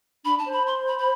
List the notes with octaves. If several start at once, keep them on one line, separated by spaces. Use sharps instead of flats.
D4 B5
A5
C5
B5
C6
B5
B5